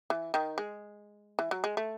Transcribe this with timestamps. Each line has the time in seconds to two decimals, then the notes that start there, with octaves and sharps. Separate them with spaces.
0.10 E3
0.34 D#3
0.58 G#3
1.39 E3
1.51 F#3
1.64 G#3
1.77 A3